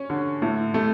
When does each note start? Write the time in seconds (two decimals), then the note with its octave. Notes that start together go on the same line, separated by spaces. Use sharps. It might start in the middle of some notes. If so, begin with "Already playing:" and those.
Already playing: C#4
0.10 D3
0.42 A2
0.74 A3